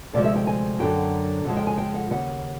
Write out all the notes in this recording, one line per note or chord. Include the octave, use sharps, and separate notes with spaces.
D2 C3 F3 G#3 D5
E5
G5
G#5
F#2 D3 F#3 G5
F2 C#3 F3 G#3 F#5
G5
G#5
G5
F#5
D#2 C#3 F#5